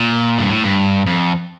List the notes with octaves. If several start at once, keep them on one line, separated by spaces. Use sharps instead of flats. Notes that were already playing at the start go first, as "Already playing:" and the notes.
Already playing: A#2
G2
A2
G2
F2